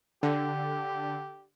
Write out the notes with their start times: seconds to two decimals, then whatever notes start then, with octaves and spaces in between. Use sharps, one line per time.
0.23 D3 G4